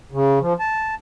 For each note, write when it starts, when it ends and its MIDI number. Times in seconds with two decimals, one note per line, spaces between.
0.12 0.39 49
0.41 0.53 53
0.60 0.95 81